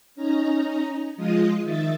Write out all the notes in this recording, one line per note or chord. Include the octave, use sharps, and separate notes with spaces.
C#4 D#4 A#5
F3 G#3 F4 D#5 D#6
D#3 E5 A6